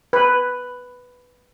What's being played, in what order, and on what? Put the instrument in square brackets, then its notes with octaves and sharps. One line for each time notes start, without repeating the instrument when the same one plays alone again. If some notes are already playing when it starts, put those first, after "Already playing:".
[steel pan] B4